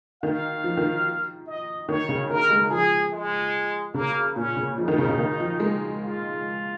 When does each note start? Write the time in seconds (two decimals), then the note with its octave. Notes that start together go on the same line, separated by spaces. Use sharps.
0.23 D#3 F5
0.64 F3
0.77 D#3
1.47 D#5
1.89 D#3 C#5
2.09 C#3
2.30 D#3 A#4
2.51 G#3
2.70 F3 G#4
3.13 G#3
3.94 C#3 A#3
4.36 A#2 C#4
4.56 C#3
4.77 F3 D#4
4.88 D#3
4.98 C#3
5.09 C#3
5.19 D#3
5.40 F3
5.60 G#3
6.02 F4